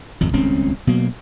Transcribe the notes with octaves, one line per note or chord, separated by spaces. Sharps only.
G#1 F2
D#1 C#2 C4 C#4
B2 F#3 A#3